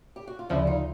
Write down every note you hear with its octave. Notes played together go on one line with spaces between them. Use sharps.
G4
F#4
F4
D2 C#3 F3 D4 E4
D#4 F4